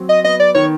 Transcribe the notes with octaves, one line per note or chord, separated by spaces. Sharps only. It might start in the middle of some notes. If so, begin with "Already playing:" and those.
Already playing: F#3 C4
D#5
B3 D#5
D5
D#3 C#5